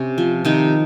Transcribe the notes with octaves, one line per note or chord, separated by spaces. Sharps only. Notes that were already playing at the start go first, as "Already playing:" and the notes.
Already playing: C3 C#4
F3
C3 D#3 D#4